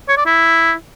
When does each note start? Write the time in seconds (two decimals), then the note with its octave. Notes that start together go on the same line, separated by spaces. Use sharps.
0.09 C#5
0.17 D5
0.26 E4